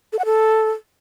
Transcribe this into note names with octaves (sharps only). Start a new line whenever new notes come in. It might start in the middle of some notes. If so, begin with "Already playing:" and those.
A4
F#5
A4